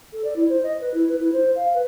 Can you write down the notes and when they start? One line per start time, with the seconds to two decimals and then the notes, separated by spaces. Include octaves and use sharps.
0.13 A4
0.24 D5
0.36 E4
0.49 C5
0.63 D#5
0.81 B4
0.94 E4
1.09 B4
1.20 E4
1.33 C5
1.55 F5
1.74 B4